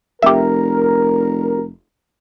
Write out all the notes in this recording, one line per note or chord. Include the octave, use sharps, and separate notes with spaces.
F1 G4 A#4 E5